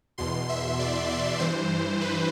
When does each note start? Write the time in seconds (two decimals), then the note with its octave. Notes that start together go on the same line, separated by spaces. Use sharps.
0.18 E2 B2 C6
0.49 E5
0.79 D5
1.09 D5
1.39 G2 E3 C5
2.01 B4